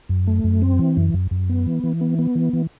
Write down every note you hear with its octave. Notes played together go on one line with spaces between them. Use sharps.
F#2
A3
F#2
C4
E3
F#2
F#2
F#2
B3
E3
E3
B3
B3
E3
E3